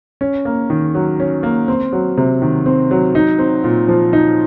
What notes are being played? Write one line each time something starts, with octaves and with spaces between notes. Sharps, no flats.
C#4
A#3
D#3
F#3
C#4
A#3
C4
F#3
C3
D#3
C4
F#3
D#4
C4
A#2
F3
D#4